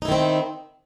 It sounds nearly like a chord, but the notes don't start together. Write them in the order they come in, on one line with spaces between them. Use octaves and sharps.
D#4 E4 D#3 C4